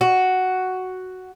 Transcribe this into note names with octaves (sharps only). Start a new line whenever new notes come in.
F#4